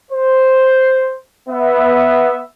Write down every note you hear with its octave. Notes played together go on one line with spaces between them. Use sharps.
C5
B3 E5